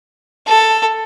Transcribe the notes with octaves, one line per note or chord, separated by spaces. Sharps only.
A4